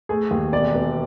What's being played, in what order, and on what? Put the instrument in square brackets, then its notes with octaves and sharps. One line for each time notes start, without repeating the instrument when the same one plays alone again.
[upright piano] A3 G#4
D#2
E1 D5
E1